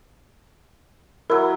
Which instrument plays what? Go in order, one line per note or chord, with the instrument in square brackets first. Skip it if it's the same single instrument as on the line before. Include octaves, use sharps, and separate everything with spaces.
[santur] F#3 E4 [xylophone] A#4